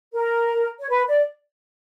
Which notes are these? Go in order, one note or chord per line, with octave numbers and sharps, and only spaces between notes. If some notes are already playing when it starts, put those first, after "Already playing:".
A#4
C#5
B4
D5